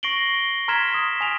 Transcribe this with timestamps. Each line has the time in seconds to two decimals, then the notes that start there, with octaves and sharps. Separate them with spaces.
0.03 C#6 A#6 C7 D7 F#7 G7
0.68 A#5 C6 F6 G#6 B6 E7
0.94 D#6
1.21 G#5 F7